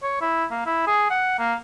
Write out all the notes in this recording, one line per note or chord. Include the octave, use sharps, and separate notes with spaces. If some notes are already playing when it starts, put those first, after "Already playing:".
C#5
E4
A#3
E4
G#4
F#5
A#3